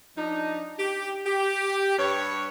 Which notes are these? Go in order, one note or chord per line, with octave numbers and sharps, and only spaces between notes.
F3 D4 D#4
G4
G4
G2 B4 C#5